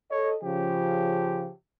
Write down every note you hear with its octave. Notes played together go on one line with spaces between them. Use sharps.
A4 C#5 D#5
C#3 F3 G4